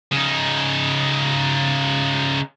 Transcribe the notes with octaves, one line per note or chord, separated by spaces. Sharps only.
C#3 D#4